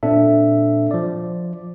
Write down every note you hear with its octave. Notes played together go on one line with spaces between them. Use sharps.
A#2 C4 D4 A4 E5
F3 D5